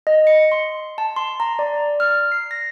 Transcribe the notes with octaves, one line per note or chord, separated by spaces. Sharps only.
D#5
C#7
C6
A5
C6
A#5
D5
F6
C7
A#6